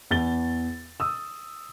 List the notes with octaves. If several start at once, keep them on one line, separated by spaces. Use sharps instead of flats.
E2 A6 G7
D#6 E6